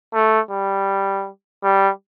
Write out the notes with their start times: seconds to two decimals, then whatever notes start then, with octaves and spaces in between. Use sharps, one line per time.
0.14 A3
0.51 G3
1.64 G3